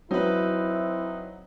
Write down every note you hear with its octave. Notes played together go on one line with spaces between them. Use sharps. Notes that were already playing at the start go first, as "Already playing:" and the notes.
F#3 C4 D#4 E4 B4